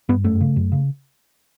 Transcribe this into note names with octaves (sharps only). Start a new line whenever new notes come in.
G2 B3
F#2 A3
C#3
F#2
C#3